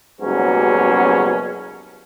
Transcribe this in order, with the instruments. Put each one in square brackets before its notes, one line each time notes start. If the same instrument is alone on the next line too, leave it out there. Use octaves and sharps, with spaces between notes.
[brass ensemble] F#1 G#2 B2 F#3 G3 C#4